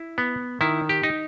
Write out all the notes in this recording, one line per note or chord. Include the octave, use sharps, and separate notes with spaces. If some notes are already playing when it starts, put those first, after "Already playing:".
Already playing: E4
B3
D#3 E4
G4
D#4